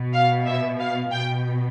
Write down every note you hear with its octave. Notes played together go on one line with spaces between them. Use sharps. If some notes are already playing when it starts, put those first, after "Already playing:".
Already playing: B2
F5
E5
F5
B2 G5